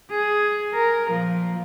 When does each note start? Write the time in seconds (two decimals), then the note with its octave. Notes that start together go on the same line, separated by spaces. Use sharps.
0.10 G#4
0.74 A#4
1.10 A#2 F3